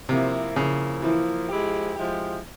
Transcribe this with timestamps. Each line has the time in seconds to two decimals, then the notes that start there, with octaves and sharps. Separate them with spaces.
0.09 C3 F3 A#3 E4
0.55 C#3 F3 A#3 E4
1.02 E3 F3 A#3 E4
1.49 F3 G#3 E4 G4
1.96 F3 G#3 E4 G4